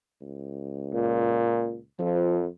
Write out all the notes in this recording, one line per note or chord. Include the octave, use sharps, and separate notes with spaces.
C#2
A#2
F2 F3